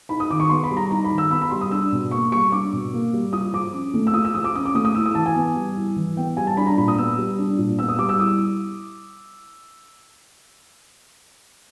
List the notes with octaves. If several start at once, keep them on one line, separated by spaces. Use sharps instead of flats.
D#4 B5
D#6
D#3 D6
C#6
B3 C6
B5
G3
A#5
D#4 A#5
B5
D#3
E6
B3 B5
B5
G3 C6
D#6
D4 E6
B2
A#3 C#6
G3 C#6
D4 D6
B2
A#3
G3
F4 D#6
F3 D6
C#4
A3
E6
F4 D#6
E6
F3 D#6
D6
C#4 D#6
D6
A3 D#6
D#6
E4 E6
D#6
E3 A5
G#5
B3
G3
E4
E3
B3 G5
G3 G#5
A5
D4 B5
A#5
A#2 B5
D#6
B3 E6
G3
D4
A#2
B3 E6
D#6
G3 D6
E6
E4 D#6